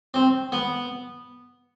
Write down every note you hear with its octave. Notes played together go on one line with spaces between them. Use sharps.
C4
B3